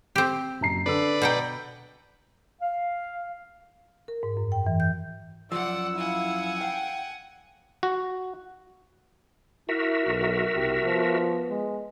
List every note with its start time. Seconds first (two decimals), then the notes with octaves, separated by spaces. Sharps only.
0.16 C4 G4
0.61 F#1 A#5 C7
0.86 D3 A4 B4 D5 E6
1.22 B2 F#5 G5 A#5 G6
2.62 F5
4.08 A#4
4.23 G#2
4.37 F#2
4.52 G5
4.67 E3
4.80 G6
5.52 F#2 F3 D5 F#5 E6
5.97 E4 F5 F#5 G#5
6.61 F5 G5
7.83 F#4
9.69 E4 F#4 A#4 E5
10.07 B1
10.55 C2 G4
10.84 F3 B3
11.50 G#3